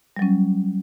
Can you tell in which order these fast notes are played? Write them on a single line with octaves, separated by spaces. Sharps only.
G3 F#3 C#4